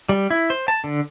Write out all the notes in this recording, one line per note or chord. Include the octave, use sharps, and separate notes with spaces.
G3
E4
C5
A5
D3